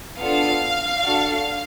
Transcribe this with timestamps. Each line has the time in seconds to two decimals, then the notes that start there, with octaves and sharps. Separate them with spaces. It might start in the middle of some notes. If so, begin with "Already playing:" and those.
0.18 B3 D4 F4 A4 F5
1.02 D4 F#4 A4